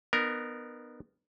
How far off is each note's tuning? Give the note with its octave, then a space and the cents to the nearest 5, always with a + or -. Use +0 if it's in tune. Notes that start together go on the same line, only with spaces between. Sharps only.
B3 +0 D#4 -40 A#4 +0